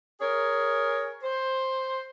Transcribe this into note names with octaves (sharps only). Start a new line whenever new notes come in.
G#4 A#4 C#5
C5